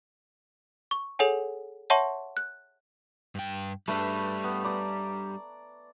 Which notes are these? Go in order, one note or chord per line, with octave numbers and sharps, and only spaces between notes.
C#6
G#4 A4 C#5 F#5 G#5
C#5 E5 F#5 A5 C6 C#6
F#6
G2 G5
G3 A3 D4 B4
B3
D5 A#5 D6